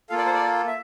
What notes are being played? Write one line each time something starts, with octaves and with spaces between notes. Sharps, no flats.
A#3 F4 A4 F5
D5
C5
D5
E5